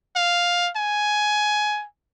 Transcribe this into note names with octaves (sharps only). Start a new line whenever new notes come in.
F5
G#5